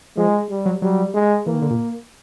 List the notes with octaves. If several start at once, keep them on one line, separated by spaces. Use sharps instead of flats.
F3 G#3
G3
F#3
F#3 G3
G#3
E3 A#3
D#3
D3
A#2